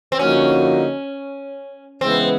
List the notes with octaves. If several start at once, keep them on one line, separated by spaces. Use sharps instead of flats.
C4
D3 F3 A#3 C#4 D#4 F#4
C#3 E3 G#3 B3 C4 E4